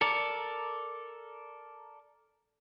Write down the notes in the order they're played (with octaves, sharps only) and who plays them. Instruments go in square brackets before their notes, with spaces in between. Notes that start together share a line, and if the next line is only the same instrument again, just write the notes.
[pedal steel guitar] A4 A#4 D5 [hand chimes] C#7